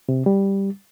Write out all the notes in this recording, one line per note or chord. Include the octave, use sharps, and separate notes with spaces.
C3
G3